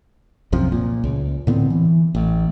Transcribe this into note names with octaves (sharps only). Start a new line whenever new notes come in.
C2 F#2 C3 F3
A#2
C#2
A2 D3 B3 C4
E3
A1